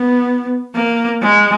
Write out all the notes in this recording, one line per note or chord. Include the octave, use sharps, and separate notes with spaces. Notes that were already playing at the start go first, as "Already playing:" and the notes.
Already playing: B3
A#3
G#3